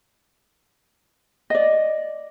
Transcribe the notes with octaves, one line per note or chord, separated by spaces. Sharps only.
D5 D#5